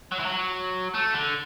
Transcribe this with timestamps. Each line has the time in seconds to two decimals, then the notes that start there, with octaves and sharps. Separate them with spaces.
0.12 F#3
0.19 E3
0.26 F#3
0.94 A3
1.14 D3